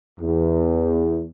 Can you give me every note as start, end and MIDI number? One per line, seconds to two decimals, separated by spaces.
0.20 1.26 40